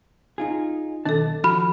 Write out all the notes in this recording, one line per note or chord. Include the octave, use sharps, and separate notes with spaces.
D#4 F4 G#4
B1 D#3 D4 A4 A5
F3 F#4 B5 F6